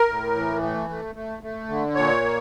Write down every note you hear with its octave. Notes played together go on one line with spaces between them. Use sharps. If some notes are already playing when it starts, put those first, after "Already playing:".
Already playing: A#4
A2
E3
A3
A3
A3
A3
D3
A#2 C#5
A#3